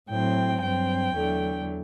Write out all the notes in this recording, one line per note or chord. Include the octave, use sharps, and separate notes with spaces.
A2 F#3 C4 G5
G2 F#3 C4 G5
E2 D3 F#3 A3